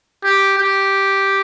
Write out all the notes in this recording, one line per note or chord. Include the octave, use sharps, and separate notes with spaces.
G4
G4